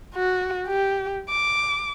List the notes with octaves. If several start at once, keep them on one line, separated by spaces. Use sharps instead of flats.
F#4
G4
D6